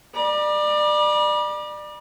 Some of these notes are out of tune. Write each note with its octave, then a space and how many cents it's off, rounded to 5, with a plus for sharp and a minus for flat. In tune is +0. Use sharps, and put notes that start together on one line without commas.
D5 +25 B5 -40